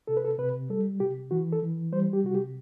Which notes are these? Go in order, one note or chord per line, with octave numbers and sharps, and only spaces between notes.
C3 A4
B4
A4
C3 B4
G3 A4
C3 G4
E3 F#4
A4
E3
G3 C5
G4
C3 F#4
G4